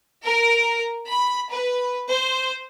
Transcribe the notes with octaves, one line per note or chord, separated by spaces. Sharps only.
A#4
B5
B4
C5